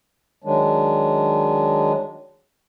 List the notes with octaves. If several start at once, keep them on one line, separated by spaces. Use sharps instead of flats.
D#3 F#3 G#3 D4